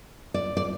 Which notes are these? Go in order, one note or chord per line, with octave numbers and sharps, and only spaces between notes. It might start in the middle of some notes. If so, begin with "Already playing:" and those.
D5
D5